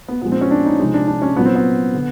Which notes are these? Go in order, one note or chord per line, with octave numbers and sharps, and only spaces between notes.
B3
A#2 F3 G#3 B3
C4
C#4
D4
D#4
C3 F3 G#3 D#4
D4
D4
C#4
A#2 F#3 B3
C4
B3
D3